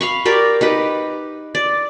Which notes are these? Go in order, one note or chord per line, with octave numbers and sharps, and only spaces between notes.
F5 B5 C#6
G4 A#4 D5
D#4 G4 B4
D5